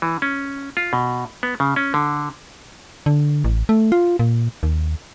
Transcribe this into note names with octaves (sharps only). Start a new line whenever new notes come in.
E3
C#4
F4
B2
B3
C#3
C#4
D3
D3
A1
A3
F4
A#2
D#2